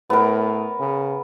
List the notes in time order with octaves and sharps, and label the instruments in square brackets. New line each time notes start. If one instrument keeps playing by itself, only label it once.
[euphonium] A2 [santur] B3 A#4
[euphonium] C#3